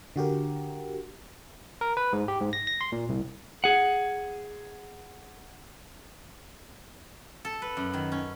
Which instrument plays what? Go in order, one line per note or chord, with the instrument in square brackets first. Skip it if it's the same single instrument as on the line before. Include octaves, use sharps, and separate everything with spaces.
[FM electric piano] D3 F#4 G4 A#4
[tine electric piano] A#4
B4
G#2
G4
G#2
A#6
A#6
C6
A#2
C2
[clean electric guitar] G#4 F#5
[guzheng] A4
B4
F#2
D#3
C#4